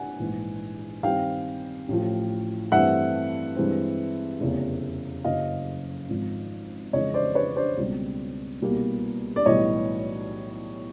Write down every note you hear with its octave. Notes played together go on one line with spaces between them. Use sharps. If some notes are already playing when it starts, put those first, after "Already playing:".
Already playing: F#5 G#5
A#1 G#2 E3
G2 D#3 G3 C4 F5 G5
A1 A2 F3
G2 E3 A3 C4 E5 F#5
G2 E3 G#3 C4
F1 E2 C#3
F#1 F#2 C#3 D#5 F5
G#1 G#2 F3
F2 C#3 E3 G#3 C#5 D#5
C5 D5
B4 C#5
C5 D5
C#2 B2 G3 C4
C2 B2 G3 A#3
D5
B1 A2 E3 G3 C#5 D#5